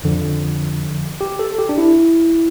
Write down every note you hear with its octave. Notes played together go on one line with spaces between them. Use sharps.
F2 D3 F3
G4
A4
G4
D4
E4